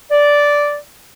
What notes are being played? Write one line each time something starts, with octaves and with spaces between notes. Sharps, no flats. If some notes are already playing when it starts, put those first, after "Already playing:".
D5